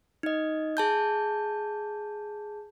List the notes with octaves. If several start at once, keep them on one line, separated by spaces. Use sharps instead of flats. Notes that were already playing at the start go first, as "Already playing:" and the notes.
D#4 D#5
G#4 A5 G6